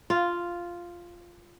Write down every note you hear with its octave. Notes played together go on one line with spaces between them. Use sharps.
F4